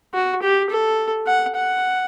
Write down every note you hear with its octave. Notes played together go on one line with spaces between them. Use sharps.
F#4
G4
A4
F#5
F#5